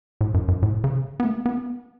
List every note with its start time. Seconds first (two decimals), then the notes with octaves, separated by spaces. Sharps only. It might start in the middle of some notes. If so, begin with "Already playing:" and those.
0.21 A2
0.34 F#2
0.48 F#2
0.62 A2
0.84 C#3
1.20 B3
1.25 A3
1.46 B3